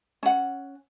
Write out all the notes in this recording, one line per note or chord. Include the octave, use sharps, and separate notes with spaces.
C#4 F#5